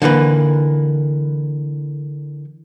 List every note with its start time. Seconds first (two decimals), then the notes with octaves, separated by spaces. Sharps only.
0.02 D3 E3 A#3 B4